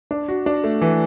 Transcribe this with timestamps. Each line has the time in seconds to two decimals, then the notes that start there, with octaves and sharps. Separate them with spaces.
0.11 D4
0.28 F#4
0.46 D4
0.64 A3
0.82 E3